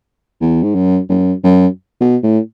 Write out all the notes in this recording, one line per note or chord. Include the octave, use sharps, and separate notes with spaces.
E2
G#2
F#2
F#2
F#2
B2
A2